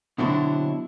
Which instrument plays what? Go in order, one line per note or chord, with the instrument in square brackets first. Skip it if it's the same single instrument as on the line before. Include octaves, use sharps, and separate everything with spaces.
[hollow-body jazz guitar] B2 D3 F#3 C4 D4 E4